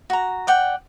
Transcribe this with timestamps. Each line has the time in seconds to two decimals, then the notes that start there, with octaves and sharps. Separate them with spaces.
0.10 F#4 A#5
0.47 D5 F#5 G5